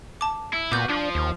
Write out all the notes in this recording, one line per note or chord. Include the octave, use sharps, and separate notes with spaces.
A5 D6
E4
A#2 B3 F#4 D6 G6
F3 D4
D#2